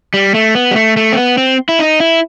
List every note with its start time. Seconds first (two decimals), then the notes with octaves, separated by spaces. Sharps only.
0.14 G3
0.34 A3
0.55 B3
0.71 G3
0.76 A3
0.97 A3
1.12 C4
1.17 B3
1.38 C4
1.69 E4
1.79 D#4
2.00 E4